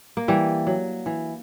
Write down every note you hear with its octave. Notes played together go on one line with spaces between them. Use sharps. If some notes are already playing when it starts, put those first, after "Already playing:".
A#3
E3 G3
F#3
E3